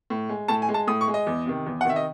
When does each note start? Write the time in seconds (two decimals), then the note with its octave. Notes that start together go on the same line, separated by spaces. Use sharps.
0.10 A2
0.29 G#3
0.48 A2 A5
0.62 G#5
0.69 G#3
0.74 A5
0.87 A2 D#6
1.01 C#6
1.08 G#3
1.14 D#5
1.27 E2
1.46 C3 D#3
1.66 E2
1.81 F#5
1.85 C3 D#3 E5
1.96 D#5